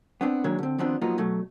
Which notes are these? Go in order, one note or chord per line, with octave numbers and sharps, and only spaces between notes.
B3 C4 D4
D#3 F#3 G#3 A#3 D4 C#5
D3 C4
D#3 F3 B3 C4 D4
F3 F#3 A#3 B3 D#4 F4
B2 F#3 A3